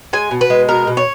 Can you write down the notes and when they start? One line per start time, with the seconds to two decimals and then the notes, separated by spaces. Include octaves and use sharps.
0.13 G#3 G#5
0.31 B2
0.41 B4
0.50 G#3
0.69 B2 A#4
0.87 B2
0.97 C#5